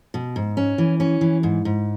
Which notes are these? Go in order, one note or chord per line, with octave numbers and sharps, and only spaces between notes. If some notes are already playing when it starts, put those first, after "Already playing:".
B2
G#2
C#4
E3
C#4
E3
G#2
G#2